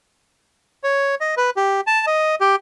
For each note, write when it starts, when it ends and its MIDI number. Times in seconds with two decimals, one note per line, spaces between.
0.84 1.15 73
1.21 1.35 75
1.37 1.50 71
1.57 1.81 67
1.87 2.06 81
2.07 2.35 75
2.41 2.56 67